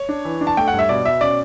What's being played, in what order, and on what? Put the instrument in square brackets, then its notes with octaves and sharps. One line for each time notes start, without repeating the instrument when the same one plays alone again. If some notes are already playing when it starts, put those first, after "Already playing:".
Already playing: [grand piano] C#5
D4
E3
D4
A5
A3 G5
F#5
G2
E5
B2 D5
B2 E5
C#4 D5